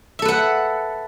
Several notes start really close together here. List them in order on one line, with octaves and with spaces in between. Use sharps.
E5 A4 B4 F#5